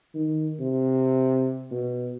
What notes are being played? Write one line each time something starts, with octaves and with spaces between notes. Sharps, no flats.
D#3
C3
B2